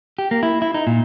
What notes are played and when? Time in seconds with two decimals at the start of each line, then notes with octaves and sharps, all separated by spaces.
0.19 G4
0.31 A#3
0.43 E4
0.62 E4
0.74 D#4
0.87 A#2